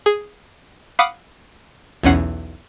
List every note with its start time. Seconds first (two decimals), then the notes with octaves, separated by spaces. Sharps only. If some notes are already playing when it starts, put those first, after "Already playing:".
0.06 G#4
0.99 F5 F#5 B5 D6 D#6 F6
2.03 B1 E2 C#4 F#5 C7